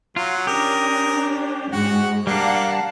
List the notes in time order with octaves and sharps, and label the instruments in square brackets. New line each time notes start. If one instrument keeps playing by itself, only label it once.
[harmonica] F#3 [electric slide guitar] F4
[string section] C#4 D4 [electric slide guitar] G4 [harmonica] A#4 D#6
[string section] G#2 G#3 [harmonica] F#4 F#5
[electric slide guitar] G3 D4 [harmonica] A#3 [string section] F5 F#5 A5